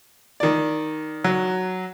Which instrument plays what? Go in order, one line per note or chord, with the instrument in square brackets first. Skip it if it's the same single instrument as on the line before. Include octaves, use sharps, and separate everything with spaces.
[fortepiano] D#3 D5
[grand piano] F#3